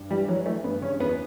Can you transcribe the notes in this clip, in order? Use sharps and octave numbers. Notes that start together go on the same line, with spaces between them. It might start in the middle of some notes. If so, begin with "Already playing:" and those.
Already playing: G2
E3 G3
E3 F#3
E3 A3
G2 B3
C#3 C#4
E2 B3